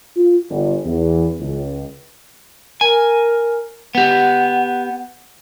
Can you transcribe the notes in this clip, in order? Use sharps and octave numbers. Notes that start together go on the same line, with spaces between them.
F4
G1
E2
C#2
A#4 G#5
B3 G4 F#5